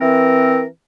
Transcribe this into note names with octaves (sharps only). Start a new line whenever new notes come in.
E3 C4 A#4